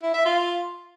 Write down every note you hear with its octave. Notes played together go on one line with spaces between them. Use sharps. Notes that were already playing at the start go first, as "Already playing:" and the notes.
E4
E5
F4